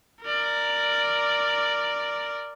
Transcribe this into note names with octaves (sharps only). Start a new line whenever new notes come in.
A#4 D5